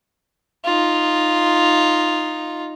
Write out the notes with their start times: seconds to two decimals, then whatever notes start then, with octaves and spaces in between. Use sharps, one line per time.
0.65 D#4 F4